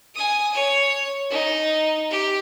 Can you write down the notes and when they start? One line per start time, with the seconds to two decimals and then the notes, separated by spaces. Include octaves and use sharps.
0.15 G#5 D#6
0.54 C#5
1.30 D#4
2.10 G4